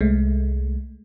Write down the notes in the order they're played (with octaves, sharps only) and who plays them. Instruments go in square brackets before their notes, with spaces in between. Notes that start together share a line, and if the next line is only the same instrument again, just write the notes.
[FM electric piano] C2 G#3 A3